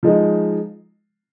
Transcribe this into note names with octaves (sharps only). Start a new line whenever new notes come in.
F3 G#3 D#4